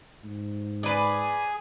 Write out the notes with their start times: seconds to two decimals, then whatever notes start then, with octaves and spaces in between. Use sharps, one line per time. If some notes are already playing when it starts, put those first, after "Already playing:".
0.24 G#2
0.83 G#4 B4 D5 G#5